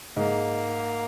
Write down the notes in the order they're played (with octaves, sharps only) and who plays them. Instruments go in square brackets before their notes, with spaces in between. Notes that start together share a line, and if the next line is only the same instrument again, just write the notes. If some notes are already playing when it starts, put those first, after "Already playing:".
[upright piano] G#2 [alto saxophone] A#3